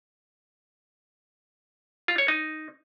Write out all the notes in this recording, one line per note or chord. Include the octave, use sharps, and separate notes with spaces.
F4
C#5
D#4